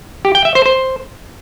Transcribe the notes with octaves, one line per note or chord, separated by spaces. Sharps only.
G4
G5
E5
C5
C5